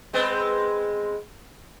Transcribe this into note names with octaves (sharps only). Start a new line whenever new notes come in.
G#3 B3 C4